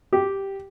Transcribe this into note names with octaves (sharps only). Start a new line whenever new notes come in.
G4